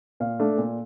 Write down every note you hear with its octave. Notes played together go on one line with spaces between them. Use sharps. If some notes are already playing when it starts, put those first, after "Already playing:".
A#2 F5
A3 D4
A#2